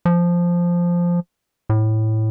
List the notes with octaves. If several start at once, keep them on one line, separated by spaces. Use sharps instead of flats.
F3
A2